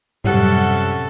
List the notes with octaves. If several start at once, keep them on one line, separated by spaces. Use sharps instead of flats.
F#2 A2 C3 G3 C#4 A4 F#5